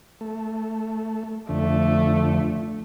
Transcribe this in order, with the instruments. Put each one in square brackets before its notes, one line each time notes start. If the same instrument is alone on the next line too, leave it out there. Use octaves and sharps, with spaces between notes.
[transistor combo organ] A3
[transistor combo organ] F2 D3 [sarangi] A3